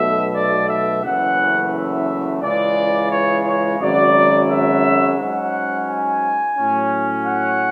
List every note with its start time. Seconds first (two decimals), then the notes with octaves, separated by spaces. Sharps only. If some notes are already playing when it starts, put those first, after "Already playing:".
Already playing: B1 B2 A3 E5
0.34 D5
0.68 E5
1.03 F#1 E2 C#3 E3 A3 F#5
1.72 E5
2.42 C#2 C#3 E3 G#3 D5
3.11 C#5
3.45 C#5
3.80 G#1 F#2 C#3 F#3 D5
4.49 E5
5.18 G#2 F#3 C#4 F#5
5.87 G#5
6.57 A2 F#3 C#4
7.26 F#5